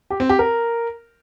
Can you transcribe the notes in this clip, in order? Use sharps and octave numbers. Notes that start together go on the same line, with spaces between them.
G4
C4
G4
A#4